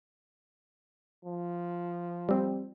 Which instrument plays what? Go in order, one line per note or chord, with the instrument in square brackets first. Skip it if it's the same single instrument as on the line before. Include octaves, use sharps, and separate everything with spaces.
[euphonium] F3
[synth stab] G3 C4